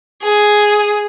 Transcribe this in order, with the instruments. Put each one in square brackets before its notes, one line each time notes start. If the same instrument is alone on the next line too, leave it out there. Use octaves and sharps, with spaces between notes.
[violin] G#4